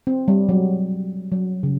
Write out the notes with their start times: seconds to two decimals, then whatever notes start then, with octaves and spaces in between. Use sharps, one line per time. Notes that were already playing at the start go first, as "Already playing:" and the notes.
0.07 C4
0.28 G3
0.49 F#3
1.32 F#3
1.63 C#3